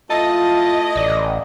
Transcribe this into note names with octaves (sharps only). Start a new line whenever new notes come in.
A3 E4 F4 D#5 A5
A1 D5